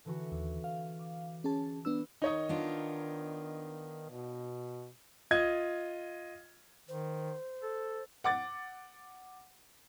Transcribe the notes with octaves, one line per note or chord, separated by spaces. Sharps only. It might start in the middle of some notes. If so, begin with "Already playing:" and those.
D3 E3 F#4
D#2
F5
D6
C#4 G#4 A5
B3 D4 B4 E6
D#3 D#4 C#5 D#5
B3 D4 F4
B2
F4 D#5 G#6
D#3 C5
A4
F#5 D6 A6